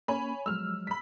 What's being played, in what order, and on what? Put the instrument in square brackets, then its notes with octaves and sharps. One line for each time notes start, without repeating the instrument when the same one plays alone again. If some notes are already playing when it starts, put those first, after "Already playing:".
[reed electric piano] A#3 C#4 [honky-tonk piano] C#5 G#5 B5
[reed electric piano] F3 F#3 G#3 [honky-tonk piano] E6 F6
[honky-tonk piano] B5 B6